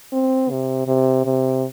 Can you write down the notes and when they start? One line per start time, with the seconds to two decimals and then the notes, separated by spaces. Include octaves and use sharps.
0.12 C4
0.51 C3
0.87 C3
1.25 C3